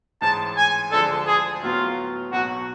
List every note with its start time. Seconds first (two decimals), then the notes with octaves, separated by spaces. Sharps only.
0.21 A1 G#2 G#3 A5
0.57 G#5
0.92 D2 D3 F3 G#3 D4 A4
1.27 G#4
1.63 A2 F#3 B3 F4
2.32 B1 B2 F#3 F#4